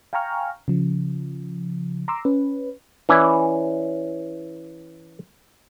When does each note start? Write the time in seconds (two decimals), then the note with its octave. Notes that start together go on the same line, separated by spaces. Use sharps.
0.13 F5 G5 G#5 A#5 C#6 F6
0.68 C#3 F3
2.08 A#5 C6 D6 E6
2.25 C#4 B4
3.09 E3 C#4 E4 D5